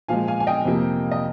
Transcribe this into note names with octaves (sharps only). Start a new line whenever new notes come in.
A#2 F3 G#3 F5 G#5
F5 G#5
G#5
D#5 G5
F2 C3 F3 A#3
D#5